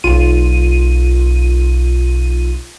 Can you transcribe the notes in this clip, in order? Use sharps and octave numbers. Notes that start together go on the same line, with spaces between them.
B1 F4 D#7